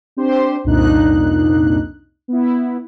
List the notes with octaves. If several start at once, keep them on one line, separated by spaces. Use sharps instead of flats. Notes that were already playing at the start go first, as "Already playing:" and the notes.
C4 D4 G4 C5 C6
C2 F2 A#2 D4 D#4 F#6
B3 E4